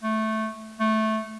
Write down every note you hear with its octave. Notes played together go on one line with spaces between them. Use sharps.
A3
A3